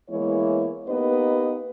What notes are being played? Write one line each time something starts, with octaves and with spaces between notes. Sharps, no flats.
E3 G#3 A#3 B3 E4 C#5
A#3 B3 D#4 G4 B4 D#5